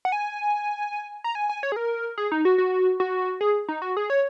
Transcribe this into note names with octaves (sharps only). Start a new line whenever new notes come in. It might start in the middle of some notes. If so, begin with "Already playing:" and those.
F#5
G#5
A#5
G#5
G#5
C#5
G#4
A#4
G#4
D#4
F#4
F#4
F#4
G#4
D#4
F#4
G#4
C#5